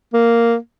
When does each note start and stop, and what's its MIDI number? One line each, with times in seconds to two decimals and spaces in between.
0.13 0.56 58